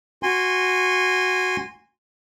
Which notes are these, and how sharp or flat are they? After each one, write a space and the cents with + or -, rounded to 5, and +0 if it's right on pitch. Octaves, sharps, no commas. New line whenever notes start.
F#4 -5 G#5 -20 C6 +0